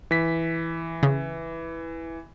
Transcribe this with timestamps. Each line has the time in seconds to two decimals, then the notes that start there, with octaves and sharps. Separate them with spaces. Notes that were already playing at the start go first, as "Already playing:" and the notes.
0.11 E3 B6
1.03 C#3